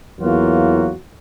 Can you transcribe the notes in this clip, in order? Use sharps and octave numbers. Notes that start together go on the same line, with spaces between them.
E2 E3 F#3 A#3 F4 F#4